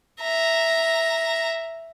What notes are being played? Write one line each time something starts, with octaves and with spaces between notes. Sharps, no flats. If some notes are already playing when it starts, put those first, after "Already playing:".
E5 A#5